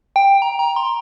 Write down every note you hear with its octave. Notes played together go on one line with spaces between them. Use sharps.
G5
A#5
A#5
C6